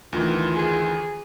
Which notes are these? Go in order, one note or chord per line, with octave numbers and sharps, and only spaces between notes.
D2 D#3 E3 F4
G#4